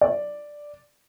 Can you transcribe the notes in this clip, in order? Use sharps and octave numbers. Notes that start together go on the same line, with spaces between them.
D5